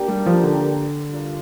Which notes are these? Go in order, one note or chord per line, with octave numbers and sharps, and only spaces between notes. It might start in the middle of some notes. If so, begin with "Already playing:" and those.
Already playing: A#3 D4 G4 A#4
G3
F3
D3
G3 D4 F4 A#4